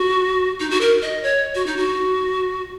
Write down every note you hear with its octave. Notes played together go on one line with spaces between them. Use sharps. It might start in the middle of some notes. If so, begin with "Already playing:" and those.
Already playing: F#4
D#4
F#4
A#4
D#5
C#5
F#4
D#4
F#4